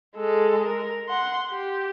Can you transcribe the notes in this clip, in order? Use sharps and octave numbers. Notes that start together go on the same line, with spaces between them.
G#3 A4
A#4
F#5 C6
G4